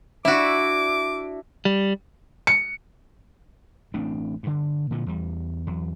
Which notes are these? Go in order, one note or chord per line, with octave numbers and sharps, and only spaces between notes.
D4 E4 F#4 E5 D6
G3
C#7
A1 A3 C4 D4
G2 D3
A#2 D3 F3
E2 G3
E2 F#3